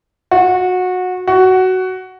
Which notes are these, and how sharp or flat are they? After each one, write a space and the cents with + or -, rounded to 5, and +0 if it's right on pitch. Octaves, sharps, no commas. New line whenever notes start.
F#4 -20
F#4 +10